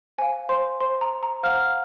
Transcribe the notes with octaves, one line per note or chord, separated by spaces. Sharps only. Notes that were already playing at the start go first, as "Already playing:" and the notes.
C5 F5 G#5
C5 C6
C5 C6
A#5
A#5
C5 F5 F#5 F6